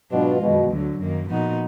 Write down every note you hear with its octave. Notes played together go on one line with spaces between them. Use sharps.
G#2 B2 F#3 D4 F4
F#2 B2 D#3 G#3
D2 D3 F#3
F#2 D#3 A#3
A#2 F3 B3 D#4 F#4